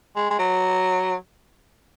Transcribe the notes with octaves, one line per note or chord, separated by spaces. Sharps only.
G#3
G#3
F#3